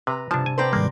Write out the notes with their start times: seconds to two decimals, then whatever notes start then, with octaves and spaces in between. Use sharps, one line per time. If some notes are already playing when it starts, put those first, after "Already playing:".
0.07 C3 B4 A#5 B5
0.31 G2 C3 F3 D4 A5
0.46 G#5
0.58 C4 B4 C5 D5 G5 A#5 C6
0.73 G#2 D#3 G3 G#3 A#3